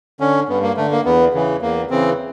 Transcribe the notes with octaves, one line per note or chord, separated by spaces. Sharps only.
D3 C#4
G2 B3
A#3
D3 A3
A#3
E2 B3
C#3 E3
E2 A#3
C#3 E3 C4